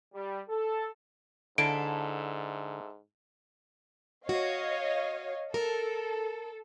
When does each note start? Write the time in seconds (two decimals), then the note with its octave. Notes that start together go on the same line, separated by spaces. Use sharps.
0.14 G3
0.49 A4
1.58 G#2 D3 E4 A4 F5 D7
4.29 F#4 C#5 D#5 F5
5.54 A4 A#4